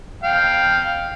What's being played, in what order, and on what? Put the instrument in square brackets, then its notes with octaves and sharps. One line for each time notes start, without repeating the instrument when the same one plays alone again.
[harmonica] F5 G5